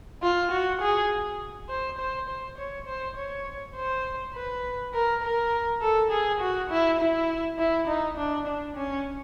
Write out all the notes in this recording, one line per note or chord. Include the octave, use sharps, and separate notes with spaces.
F4
F#4
G#4
C5
C5
C5
C#5
C5
C#5
C5
B4
A#4
A#4
A4
G#4
F#4
E4
E4
E4
D#4
D4
D4
C#4